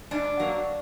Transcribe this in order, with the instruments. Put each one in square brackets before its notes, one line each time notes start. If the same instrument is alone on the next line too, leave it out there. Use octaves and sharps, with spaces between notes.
[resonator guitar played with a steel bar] G#2 D4
F#3 A#3